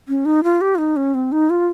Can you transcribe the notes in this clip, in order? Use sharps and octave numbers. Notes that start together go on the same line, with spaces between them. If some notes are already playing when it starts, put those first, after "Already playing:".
C#4
D#4
F4
G4
F4
D#4
C#4
C4
D#4
F4